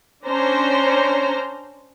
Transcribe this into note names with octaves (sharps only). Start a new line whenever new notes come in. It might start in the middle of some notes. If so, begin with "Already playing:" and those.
C#4 D4 C5 A#5